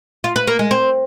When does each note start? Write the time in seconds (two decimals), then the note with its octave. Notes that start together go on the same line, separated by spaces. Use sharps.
0.24 F4
0.36 B4
0.47 A#3
0.59 G#3
0.71 C4